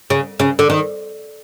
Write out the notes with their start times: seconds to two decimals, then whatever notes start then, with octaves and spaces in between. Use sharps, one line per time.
0.10 C#3
0.39 C#3
0.59 D3
0.70 D#3